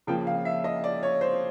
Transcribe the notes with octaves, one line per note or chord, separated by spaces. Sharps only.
C#3 F3 A#3 G5
F5
E5
D#5
D5
C#5
C5